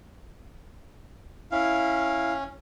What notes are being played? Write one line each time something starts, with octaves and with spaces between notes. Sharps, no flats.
C#4 E4 F5